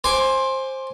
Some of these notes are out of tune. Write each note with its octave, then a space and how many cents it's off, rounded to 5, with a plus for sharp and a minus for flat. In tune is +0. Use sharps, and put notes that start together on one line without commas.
C5 +15 G#5 +0 D6 +0